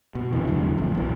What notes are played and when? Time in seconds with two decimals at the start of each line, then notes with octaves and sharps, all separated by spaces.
0.15 B2
0.33 F1 B1 C3 E3
0.47 E2 D3 F#3 A3
0.78 D#1 A1 F2
0.97 B1 B2 E3